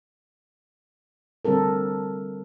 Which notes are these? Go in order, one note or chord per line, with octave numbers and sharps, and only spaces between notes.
D3 G3 C4 A4 A#4